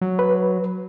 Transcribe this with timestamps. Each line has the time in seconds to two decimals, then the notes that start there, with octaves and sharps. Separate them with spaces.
0.01 F#3
0.19 B4